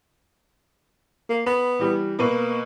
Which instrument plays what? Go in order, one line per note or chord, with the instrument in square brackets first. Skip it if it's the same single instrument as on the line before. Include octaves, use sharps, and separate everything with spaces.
[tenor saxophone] A#3
[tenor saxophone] B3 [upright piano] B5
[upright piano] E3 G3
[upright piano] B2 B4 C#6 [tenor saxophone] A#3